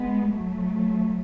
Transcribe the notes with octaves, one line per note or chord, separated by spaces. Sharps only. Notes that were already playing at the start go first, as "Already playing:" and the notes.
Already playing: G#3 B3
F#3 A3